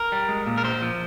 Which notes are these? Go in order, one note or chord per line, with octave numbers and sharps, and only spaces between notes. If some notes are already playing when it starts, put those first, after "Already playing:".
Already playing: A#4
G3
G#3
A#2
A#4
A#2 C5
F3